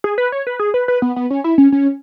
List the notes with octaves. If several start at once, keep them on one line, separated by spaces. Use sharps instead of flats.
G#4
B4
C#5
B4
G#4
B4
B4
B3
B3
C#4
E4
C#4
C#4